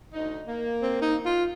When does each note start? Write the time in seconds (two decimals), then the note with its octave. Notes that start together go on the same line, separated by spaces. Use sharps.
0.13 D2 D#4
0.48 A#3
0.82 C4
1.01 D#4
1.25 F4